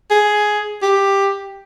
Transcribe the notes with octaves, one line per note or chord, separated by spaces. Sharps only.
G#4
G4